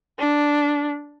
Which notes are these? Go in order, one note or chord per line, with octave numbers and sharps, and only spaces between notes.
D4